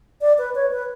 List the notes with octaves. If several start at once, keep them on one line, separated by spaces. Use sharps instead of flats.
D5
B4
C#5
B4